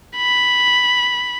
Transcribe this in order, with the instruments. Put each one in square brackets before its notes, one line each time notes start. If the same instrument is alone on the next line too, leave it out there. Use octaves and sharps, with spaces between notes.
[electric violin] B5